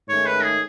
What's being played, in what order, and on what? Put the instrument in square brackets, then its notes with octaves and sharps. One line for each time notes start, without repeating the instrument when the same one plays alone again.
[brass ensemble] G#2 D#3 A3 C#4 [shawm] C#5
[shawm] B4
G#4